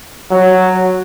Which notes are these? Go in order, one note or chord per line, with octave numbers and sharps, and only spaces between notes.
F#3